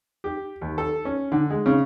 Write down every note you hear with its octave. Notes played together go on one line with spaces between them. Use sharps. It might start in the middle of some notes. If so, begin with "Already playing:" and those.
G4
D#2
A4
C#4
D3
G#3
C#3